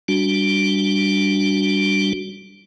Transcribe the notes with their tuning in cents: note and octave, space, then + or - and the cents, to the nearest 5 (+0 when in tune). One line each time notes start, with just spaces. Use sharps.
G3 +0 D4 -10 F#4 +0